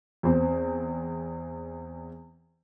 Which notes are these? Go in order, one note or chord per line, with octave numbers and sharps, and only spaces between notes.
E2 C4